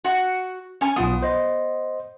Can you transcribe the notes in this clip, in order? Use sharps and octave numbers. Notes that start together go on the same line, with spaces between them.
F#4 F#5
C#4 G#5
B1 B3 F4 D#6
C5 D#5